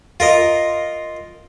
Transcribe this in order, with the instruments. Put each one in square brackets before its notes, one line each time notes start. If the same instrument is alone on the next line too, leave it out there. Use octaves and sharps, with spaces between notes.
[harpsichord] F4 A#4 D#5